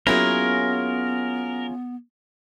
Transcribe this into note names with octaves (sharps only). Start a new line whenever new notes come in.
F#3 A#3 B3 C#4 E4 F4 G#4 A#4